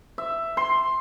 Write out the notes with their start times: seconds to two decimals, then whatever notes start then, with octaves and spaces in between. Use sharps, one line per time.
0.18 E5
0.57 C6